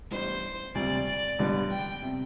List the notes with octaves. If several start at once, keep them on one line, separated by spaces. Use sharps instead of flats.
A1 A2 G3 B3 D4 C5
E1 D2 C3 G3 D5
D5
A1 G2 D3 G3 B3
G5
C3